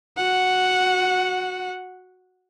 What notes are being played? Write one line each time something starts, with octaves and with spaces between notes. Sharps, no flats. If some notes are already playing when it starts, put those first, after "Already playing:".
F#4 F#5